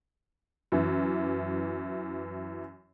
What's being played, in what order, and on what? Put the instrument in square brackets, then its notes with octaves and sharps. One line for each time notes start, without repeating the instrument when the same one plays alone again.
[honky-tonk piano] F#2 E3